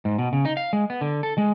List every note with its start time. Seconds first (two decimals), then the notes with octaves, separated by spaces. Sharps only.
0.05 G#2
0.18 B2
0.33 C#3
0.45 D#4
0.57 F5
0.73 G#3
0.90 B3
1.01 D3
1.23 A4
1.38 G#3